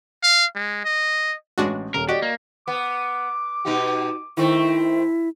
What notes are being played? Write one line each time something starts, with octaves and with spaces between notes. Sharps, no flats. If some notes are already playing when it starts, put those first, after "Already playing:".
F5
G#3
D#5
A1 G#3 D4 F#4
D#1 A#4
F#4 G4 D5 D#5
A#3
B3 D6
B2 D#4 G4
D#3 A3 C4 E4